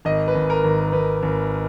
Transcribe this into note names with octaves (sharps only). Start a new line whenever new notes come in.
G#1 D#5
B4
G#1
A#4
G#1
G#1 B4
G#1